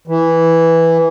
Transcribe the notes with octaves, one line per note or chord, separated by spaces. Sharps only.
E3